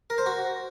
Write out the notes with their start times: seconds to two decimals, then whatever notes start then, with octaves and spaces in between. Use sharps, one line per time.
0.10 A#4
0.18 C5
0.26 F#4